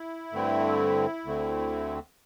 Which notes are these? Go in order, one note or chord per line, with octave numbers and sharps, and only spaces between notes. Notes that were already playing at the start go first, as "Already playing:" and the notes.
Already playing: E4
G2 D3 A3 C4
D2 D3 A3 C4